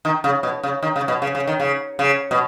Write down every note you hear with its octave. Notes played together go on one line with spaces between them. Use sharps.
D#3
C#3
B2
C#3
D#3
C#3
B2
C#3
C#3
D#3
C#3
C#3
B2